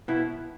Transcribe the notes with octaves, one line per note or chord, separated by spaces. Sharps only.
B2 B3 E4